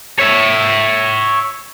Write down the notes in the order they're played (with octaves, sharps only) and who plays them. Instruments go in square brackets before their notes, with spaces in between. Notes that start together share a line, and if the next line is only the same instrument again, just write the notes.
[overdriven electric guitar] C#5 E5